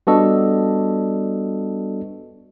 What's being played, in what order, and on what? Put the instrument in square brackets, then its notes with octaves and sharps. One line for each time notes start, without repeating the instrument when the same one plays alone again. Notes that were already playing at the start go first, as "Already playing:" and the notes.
[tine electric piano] G3 B3 D4 F#4 A4 D#5